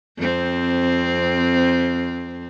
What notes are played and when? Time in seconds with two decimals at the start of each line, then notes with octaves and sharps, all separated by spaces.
0.18 F2 C4